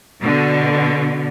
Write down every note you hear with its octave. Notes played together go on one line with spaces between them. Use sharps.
B2 D3